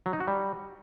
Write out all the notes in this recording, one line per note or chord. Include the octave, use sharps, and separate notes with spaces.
F#3
D#4
F#4
G3